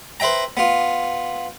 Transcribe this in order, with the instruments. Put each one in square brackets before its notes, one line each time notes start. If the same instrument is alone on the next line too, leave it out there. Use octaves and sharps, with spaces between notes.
[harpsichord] B4 C5 E5 G5 A#5
B3 F4